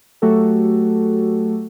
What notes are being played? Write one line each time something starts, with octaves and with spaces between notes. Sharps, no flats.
F#3 A3 F#4 G4 A4